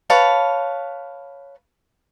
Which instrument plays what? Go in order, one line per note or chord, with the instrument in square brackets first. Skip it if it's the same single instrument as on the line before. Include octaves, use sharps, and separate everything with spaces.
[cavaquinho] B4 C#5 F5 A5